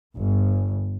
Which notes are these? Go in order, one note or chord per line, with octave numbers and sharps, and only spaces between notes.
G1